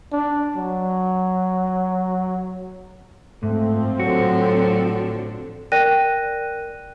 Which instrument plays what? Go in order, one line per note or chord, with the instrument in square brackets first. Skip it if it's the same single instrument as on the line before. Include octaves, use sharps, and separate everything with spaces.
[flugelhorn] D4
F#3
[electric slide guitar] G#2 [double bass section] F3 C4 [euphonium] A3
[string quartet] A2 D3 [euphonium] F#3 [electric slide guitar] F#4
[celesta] A#4 D5 G5 F#6 A#6 D#7